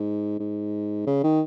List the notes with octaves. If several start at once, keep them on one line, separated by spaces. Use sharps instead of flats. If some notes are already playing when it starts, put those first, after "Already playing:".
Already playing: G#2
G#2
C#3
D#3